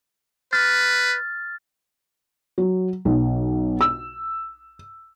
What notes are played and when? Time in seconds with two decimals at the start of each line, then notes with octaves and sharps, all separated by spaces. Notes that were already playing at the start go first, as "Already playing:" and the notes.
0.53 B4 F6 A6
2.58 F#3
3.05 B1
3.81 E6